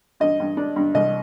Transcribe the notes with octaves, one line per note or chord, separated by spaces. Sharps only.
G2 D#5
G2
D4
G2
C2 D#5